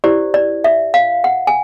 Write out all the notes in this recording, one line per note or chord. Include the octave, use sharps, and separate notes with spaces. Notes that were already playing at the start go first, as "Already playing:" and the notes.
E4 G4 C5 D5
D5
E5
F5
F#5
G#5